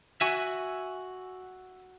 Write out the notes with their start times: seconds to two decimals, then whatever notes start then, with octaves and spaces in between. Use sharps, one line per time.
0.21 F#4 E5 G#5